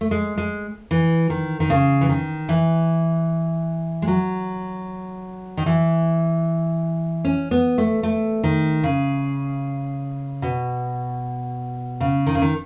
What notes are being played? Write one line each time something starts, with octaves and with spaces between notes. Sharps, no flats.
A3
G#3
G#3
E3
D#3
D#3
C#3
E3
D#3
E3
G#3
F#3
D#3
E3
C#4
B3
A3
A3
D#3
C#3
B2
C#3
D#3
C#3
D#3